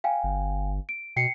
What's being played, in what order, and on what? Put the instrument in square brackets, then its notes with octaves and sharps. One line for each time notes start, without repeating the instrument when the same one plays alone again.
[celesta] F5 G5 G#5
[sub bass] G1
[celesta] D7
[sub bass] B2 [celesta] G5 C7 C#7